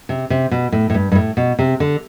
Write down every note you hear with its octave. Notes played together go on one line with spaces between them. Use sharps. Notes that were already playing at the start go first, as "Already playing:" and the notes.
C3
C3
B2
A2
A2
G2
G2
A2
B2
C3
D3